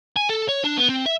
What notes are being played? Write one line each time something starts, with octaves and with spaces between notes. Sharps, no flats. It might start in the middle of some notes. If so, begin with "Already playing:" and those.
G#5
A4
C#5
D4
B3
C4
E5